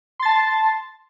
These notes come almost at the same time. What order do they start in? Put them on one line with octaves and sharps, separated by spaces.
C6 A6 A5